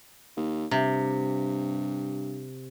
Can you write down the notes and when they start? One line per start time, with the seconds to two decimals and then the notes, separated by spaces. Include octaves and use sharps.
0.37 D#2
0.71 G2 C3